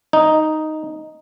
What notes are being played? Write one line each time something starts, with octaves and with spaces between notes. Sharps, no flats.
D#4